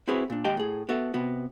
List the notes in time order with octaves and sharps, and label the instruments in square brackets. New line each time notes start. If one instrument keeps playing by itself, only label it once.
[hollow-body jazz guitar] C4 E4 F#4 G#4 B4 C#5
A#2 D4
D#2 G#3 G4 D#5 G5 A5
A2 G#4
B3 F#4 A4 E5
C3 B3 F#4